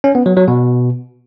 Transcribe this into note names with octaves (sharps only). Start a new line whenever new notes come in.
C#4
B3
F#3
F#3
B2